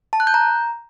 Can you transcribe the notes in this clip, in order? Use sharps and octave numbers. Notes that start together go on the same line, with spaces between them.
A5
F#6
G6
A#5